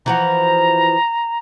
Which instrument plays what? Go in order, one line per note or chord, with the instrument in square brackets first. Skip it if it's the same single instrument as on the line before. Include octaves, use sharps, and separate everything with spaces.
[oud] E3 F3 F#4 [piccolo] A#5